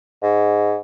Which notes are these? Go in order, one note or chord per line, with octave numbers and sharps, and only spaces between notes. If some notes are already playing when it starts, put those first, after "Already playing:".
G#2